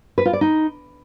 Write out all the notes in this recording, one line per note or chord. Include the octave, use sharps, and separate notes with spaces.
B4
F4
D5
D#4